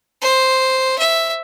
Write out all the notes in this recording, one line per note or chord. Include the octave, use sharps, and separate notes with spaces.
C5
E5